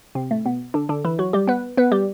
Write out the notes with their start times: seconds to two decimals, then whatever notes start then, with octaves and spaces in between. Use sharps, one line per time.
0.15 C3 C4
0.31 A2 A3
0.46 B2 B3
0.74 D3 D4
0.89 D3 D4
1.05 E3 E4
1.19 F#3 F#4
1.33 G3 G4
1.47 B3 B4
1.77 B3 B4
1.92 G3 G4